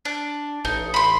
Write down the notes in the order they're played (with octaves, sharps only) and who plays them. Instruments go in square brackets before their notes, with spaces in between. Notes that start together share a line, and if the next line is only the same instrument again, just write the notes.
[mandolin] D4
[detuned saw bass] A1 [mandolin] D#4
[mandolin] B5 C6